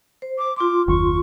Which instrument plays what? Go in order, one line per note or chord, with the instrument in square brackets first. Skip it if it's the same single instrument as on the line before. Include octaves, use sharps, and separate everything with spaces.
[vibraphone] C5
[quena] D6
[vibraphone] F4 C6 [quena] D6
[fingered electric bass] F#1 D#2 [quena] C#6